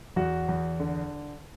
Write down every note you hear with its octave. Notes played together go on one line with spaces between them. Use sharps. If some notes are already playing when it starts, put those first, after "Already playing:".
E2 F#4
E2
D3